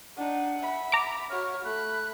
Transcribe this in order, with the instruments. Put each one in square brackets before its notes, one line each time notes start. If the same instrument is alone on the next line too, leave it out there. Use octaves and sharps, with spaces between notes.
[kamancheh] D4 D#4 [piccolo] F#5
[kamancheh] E5 B5
[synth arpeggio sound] A#5 D6
[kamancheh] F#4 C#5 [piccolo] F6
[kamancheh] A3 B5 [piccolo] F#6